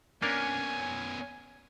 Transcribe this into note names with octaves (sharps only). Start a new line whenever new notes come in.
A#3 B3 C#4 D4 A#4 G#5